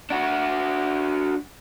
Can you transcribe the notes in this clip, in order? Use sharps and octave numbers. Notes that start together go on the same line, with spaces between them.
D4 F#4